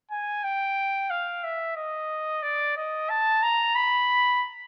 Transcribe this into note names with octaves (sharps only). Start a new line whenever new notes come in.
G#5
G5
F5
E5
D#5
D5
D#5
A5
A#5
B5